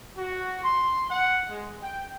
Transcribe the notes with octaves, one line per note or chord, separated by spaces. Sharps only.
F#4
C6
F#5
G#3
G5